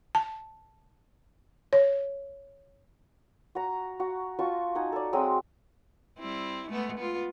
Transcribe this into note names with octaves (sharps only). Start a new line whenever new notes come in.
A5
C#5
F#4 A#5
F#4
F4 F#4 A5 C#6
D#4 F#5 G#5
A4 D5
F#3 G#3 C4 D#6
G3 C4 E4
G#3 A3 B3
B3 F4